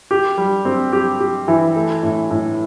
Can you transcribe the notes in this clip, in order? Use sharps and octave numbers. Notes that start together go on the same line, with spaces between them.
G4
G3
C4
G4
G4
E3
A3
A2
A2